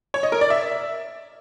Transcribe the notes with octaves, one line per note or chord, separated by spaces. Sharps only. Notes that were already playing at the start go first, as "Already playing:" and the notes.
C#5
D#5
A#4
D5
E5